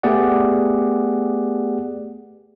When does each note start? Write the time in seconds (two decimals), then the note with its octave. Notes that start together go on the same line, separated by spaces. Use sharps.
0.03 A3 B3 G4 G#4 D5 F#5